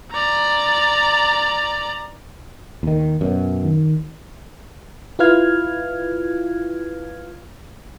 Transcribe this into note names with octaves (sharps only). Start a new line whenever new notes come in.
D5 A#5
D#2 D#3
F#2 B2
D#3
E4 F4 B4 F5 F6 G#6